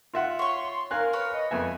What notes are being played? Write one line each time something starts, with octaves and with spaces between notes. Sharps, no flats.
F4 E5 F#5
C#5 C6 C#6
A#4 F5 G#5 F#6
B4 C#5
D#5
F2 B3 E5 G#5